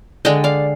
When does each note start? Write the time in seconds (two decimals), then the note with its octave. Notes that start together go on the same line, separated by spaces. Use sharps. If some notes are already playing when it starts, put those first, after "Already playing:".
0.25 D3 G#3 D#5 G5
0.44 D5 F5